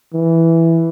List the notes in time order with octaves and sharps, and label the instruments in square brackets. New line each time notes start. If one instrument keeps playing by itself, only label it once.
[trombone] E3